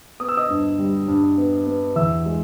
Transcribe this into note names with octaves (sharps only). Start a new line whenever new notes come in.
B3 D#6
E6
D#5 D#6
G2
G3
G2
B3
B3
E2 E5 E6
G#3